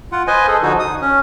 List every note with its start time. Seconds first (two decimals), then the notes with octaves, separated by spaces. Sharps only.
0.12 F4 F#5
0.27 B4 C5 D#5 G#5
0.48 G#4 A4
0.62 D3 F3 D#4 F#4
0.79 D#6
1.02 C#4